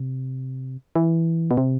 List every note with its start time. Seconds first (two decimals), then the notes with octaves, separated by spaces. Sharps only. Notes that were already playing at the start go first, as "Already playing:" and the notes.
Already playing: C3
0.96 E3
1.51 B2
1.57 C3